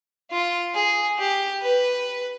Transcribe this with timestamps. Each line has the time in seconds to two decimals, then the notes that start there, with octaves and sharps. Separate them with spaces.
0.31 F4
0.75 G#4
1.19 G4
1.62 B4